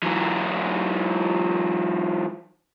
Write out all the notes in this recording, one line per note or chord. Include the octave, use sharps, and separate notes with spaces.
E3 F#3